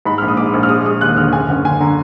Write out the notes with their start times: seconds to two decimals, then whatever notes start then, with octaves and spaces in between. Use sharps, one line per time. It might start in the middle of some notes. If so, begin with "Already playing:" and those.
0.05 G#2 B5
0.18 A#1 F6
0.28 D#6
0.37 G#2 D6
0.54 A#1
0.63 F6
0.69 G#3 D#6
0.86 G#3 D#6
1.01 D#2 F#6
1.17 D3 F6
1.33 F#1 G#5
1.49 F#1 F#5
1.65 D3 G#5
1.80 D3 A#5